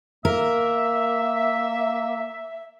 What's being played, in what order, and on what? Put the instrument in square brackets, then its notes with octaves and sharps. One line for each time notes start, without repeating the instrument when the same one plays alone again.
[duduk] A#3 [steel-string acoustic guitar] A#4 [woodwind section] E5